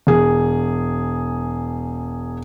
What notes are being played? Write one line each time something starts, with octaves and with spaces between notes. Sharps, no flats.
E1 G#4